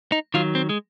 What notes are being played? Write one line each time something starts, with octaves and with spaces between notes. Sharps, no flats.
D#4
D#3 F#3 F4
C4
G#3